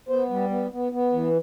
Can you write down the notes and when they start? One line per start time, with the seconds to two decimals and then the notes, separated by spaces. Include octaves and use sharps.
0.09 B3 C5
0.30 G3
0.50 B3
0.72 B3
0.92 B3
1.13 E3